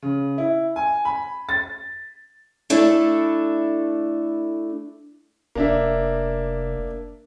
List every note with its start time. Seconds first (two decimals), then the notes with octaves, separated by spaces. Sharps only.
0.02 C#3
0.38 E4
0.76 G#5
1.05 B5
1.49 A6
2.70 A3 D4 E4 A4
5.55 F1 A#3 D4 E5